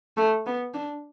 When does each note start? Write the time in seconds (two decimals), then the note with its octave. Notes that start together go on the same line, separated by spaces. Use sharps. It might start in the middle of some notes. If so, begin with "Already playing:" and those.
0.17 A3
0.46 B3
0.74 D4